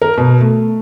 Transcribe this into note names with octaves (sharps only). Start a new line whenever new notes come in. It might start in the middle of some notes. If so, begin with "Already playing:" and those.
A#4
B2
A3